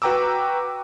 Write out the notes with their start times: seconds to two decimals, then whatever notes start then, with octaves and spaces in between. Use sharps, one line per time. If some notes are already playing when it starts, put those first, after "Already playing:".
0.02 F#4 B4 G5 A#5 D6 E6